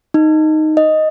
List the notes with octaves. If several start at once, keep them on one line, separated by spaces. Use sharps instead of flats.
D#4
D#5